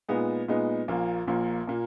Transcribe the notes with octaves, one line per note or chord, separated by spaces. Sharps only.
A#2 G#3 B3 D#4
A#2 G#3 B3 D#4
A#1 A#2 A#3
A#1 A#2 A#3
A#2 A#3